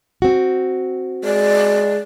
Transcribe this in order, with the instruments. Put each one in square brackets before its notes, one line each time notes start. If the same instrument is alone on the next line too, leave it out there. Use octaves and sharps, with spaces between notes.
[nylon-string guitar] C4 F#4
[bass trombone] G#3 [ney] D5